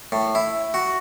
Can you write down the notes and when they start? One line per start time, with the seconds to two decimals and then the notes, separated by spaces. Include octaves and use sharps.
0.12 A2
0.35 E4
0.74 F#4